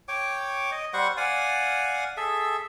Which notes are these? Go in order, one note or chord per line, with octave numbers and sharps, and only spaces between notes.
C#5 G5 D6
D#5
G3 C5 F#5 C#6
D5 F5 F#5 G#5
G#4 A4 E5